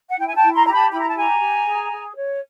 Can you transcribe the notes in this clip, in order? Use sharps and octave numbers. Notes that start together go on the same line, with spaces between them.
F#5
E4 G5
G#5
G5 A5
E4
A#5 C6
G4 A#5
A5 B5
E4 B5
A#5
A5
G4 G#5 A#5
G4
G#4
G#4
C#5